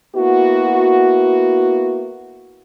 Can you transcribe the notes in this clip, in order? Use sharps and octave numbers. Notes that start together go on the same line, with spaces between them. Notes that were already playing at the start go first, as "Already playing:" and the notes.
A#3 B3 E4 F#4